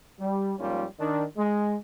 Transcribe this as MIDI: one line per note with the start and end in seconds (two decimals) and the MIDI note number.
0.19 0.53 55
0.59 0.84 44
0.59 0.84 53
0.59 0.84 55
0.59 0.84 58
0.59 0.84 61
0.59 0.84 65
0.99 1.24 51
0.99 1.24 62
1.37 1.75 56